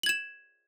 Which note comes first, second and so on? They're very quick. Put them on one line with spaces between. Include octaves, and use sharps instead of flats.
F#7 G#6 E7